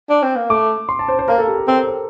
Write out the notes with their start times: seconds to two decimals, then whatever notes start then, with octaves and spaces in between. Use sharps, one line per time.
0.10 D4
0.23 C4
0.36 A#3
0.50 A3 D6
0.89 C6
0.99 A5
1.08 C5
1.19 C5
1.28 A#3 A#4
1.38 A4
1.48 G4
1.58 A4
1.67 C4 A#4
1.77 C5
1.87 A#4